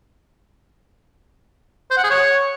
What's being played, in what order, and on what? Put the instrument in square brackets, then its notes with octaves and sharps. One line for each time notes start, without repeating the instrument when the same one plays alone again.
[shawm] C5
F#5
G#4
C#5